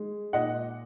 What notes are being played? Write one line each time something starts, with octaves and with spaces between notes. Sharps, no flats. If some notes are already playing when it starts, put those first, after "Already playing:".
Already playing: G#3
A#2 D#5 F#5